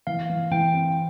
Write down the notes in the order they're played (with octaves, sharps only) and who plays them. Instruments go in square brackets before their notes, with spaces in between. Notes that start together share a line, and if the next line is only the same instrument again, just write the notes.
[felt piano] E3 [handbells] F5
[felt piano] E3
[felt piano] E3 [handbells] G5
[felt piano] C4